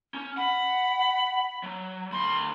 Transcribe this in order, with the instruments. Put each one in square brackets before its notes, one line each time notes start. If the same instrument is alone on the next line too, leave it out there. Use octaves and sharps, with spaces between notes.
[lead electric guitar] C#4
[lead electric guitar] F#5 [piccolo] B5
[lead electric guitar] F#3
[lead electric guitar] D2 B5 [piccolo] C6